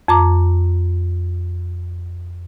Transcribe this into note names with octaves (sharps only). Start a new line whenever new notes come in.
F2 A#5 D6